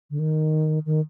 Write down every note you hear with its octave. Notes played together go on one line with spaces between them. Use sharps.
D3
D#3
D#3